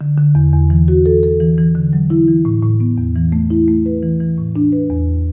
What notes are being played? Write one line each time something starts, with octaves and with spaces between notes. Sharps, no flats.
D3
D3
E2
E2
E3
F#4
A4
A4
E3
E3
D3
F#3
E4
E3
A2
A2
B3
E2
E3
A3
E4
A3
B4
E3
E3
A2
D4
B4
E2